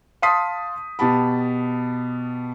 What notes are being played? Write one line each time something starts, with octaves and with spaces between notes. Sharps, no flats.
F5 A5 C6 D#6 B6 C7
B2 G4 A5 B5